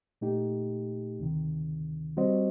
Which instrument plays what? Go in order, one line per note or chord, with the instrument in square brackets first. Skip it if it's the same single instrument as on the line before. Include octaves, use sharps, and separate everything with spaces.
[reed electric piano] A#2 A3 D#4 G4
D2 C3 D#3
G3 C4 F#4 C5 D#5